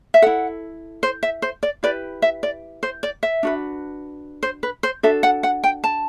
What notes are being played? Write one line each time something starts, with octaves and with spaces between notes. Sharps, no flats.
E5
E4 A4 F#5
C5
E5
C5
D5
E4 G4 B4 D5
E5
D5
C5
D5
E5
D4 F#4 B4
C5
B4
C5
D4 F#4 A4 E5
F#5
F#5
G5
A5